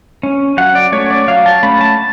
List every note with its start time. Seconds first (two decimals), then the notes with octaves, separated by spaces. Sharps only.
0.23 C#4
0.58 F#3 F#5
0.75 D5
0.92 A3 C#4 C#5
1.11 D5
1.28 F#3 F5
1.46 A5
1.63 A3 C#4 B5
1.81 A5